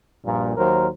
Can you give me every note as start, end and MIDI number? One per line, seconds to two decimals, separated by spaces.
0.24 0.57 34
0.24 0.57 43
0.24 0.57 46
0.57 0.87 39
0.57 0.87 54
0.57 0.87 70
0.57 0.87 72